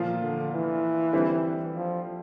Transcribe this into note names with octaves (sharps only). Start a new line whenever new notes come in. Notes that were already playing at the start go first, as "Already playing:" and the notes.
Already playing: A#2 F3 A#3 F4
D3
E3
D3 G3 C4 E4
F3